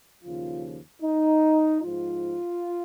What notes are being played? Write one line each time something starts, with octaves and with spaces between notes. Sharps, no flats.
D#2 C#3 F3 F4
D#4
G#2 F3 F4